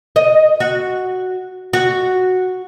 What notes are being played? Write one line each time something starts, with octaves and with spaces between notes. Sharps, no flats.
D#5
F#4
F#4